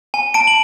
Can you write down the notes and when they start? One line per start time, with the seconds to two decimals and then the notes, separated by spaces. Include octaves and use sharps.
0.14 G#5
0.34 A5 D7
0.47 F#7